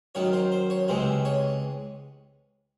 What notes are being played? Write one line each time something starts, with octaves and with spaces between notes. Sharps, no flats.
F#2 D#3 F#3 C#5
C5
C5
C#5
C#2 C3 E3 G#3 C5
C#5